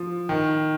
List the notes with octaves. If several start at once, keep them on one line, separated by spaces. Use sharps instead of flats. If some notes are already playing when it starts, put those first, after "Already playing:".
Already playing: F3
D#3